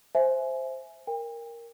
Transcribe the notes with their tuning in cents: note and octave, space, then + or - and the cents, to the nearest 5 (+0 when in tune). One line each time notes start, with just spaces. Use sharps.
C5 +0 E5 +0 G#5 +20
A#4 +0 G5 +40